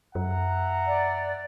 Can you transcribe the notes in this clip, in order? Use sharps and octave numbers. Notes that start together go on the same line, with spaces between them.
F#2 E5 F#5 A#5
D5